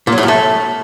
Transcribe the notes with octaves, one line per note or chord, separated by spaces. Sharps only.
A#2
F#3
A2
F#2
A3